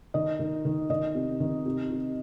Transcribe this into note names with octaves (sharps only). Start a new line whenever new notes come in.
D#3 D#5
D#3
D#3
D#3 D#5
C3
D#3
C3
C3